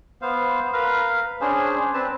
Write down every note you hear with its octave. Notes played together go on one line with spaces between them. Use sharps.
B3 C5 F5
A#4 B4 F5
C#4 D4 G#4 C5
C4 B4 A5